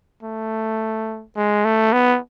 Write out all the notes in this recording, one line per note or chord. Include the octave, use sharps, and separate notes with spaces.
A3
G#3
A3
B3